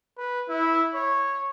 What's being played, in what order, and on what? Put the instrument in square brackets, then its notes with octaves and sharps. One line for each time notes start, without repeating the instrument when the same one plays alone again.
[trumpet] B4
E4
C#5